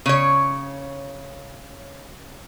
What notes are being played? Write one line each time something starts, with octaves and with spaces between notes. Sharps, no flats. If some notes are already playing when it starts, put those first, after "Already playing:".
C#3 C#5